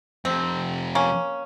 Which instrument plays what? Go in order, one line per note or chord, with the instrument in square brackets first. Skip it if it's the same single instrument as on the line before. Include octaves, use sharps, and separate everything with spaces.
[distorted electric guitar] F2 C3 [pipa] C4
[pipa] A#3 C#4